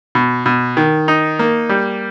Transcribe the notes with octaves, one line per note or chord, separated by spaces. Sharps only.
B2
B2
D#3
D#4
A#3
G3